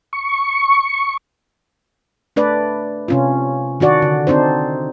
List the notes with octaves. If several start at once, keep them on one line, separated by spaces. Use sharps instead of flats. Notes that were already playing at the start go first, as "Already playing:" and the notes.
C#6
A3 D4 B4 D5
C3 C#4 F4
D#3 D4 F#4 D5
D3
C4 D4 D#4 C5